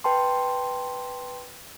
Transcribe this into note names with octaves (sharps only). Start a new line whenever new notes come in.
B4 G5 A5 C6